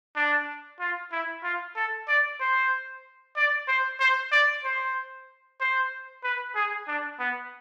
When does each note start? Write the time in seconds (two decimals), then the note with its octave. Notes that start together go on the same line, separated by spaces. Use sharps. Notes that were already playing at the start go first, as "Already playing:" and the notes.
0.16 D4
0.80 F4
1.12 E4
1.44 F4
1.76 A4
2.08 D5
2.40 C5
3.36 D5
3.68 C5
4.00 C5
4.32 D5
4.64 C5
5.60 C5
6.24 B4
6.55 G#4
6.88 D4
7.19 B3